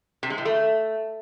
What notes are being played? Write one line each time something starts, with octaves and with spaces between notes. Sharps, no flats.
C3
G#3
A2
A3